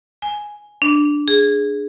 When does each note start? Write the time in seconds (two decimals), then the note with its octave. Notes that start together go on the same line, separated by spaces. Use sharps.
0.22 G#5
0.82 D4
1.28 G#4